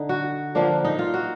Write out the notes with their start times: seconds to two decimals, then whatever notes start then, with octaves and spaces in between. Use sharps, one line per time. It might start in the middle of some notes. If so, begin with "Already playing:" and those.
Already playing: D3 D#4
0.09 F#4
0.55 D3 F3 A#3 D4
0.85 D#4
0.99 F4
1.14 F#4